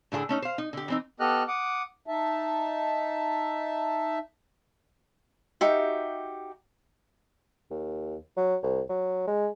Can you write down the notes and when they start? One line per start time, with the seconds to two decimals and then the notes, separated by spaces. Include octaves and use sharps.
0.12 A2 D3 F4 G#4 A4
0.29 A3 C#4 D#4
0.42 C5 F5
0.58 D#4
0.73 D3 G4
0.88 E3 C4 D#4
1.20 B3 G4 A4 D#5 F6 F#6
1.48 F#5 D6 D#6
2.07 D#4 E5 A5
5.61 D#4 F#4 G4 E5
7.71 D#2
8.37 F#3
8.63 C2
8.89 F#3
9.27 G#3